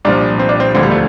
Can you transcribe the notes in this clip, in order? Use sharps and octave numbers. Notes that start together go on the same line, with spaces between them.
C2 A#2 F3 D4
C4
D4
C4
E1 D2 D3 F3 C4
G3
A3